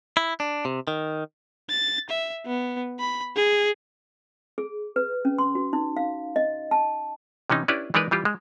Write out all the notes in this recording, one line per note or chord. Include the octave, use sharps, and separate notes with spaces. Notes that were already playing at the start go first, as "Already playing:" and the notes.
E4
D4
C3
D#3
A6
E5
B3
B5
G#4
G#4
B4
C#4
C6
F#4
D#4
F5
D#5
A5
C3 E3 C#4 D#4
C#4 D4 E4 G4 B4 D5
E3 G#3 D4 D#4 A#4 B4
E3 G3 F4 G4
G#3